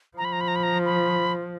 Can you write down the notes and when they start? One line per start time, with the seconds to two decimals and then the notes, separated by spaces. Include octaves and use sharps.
0.17 F3 A#5
0.25 B5
0.33 A#5
0.41 B5
0.48 A#5
0.56 B5
0.63 A#5
0.86 B5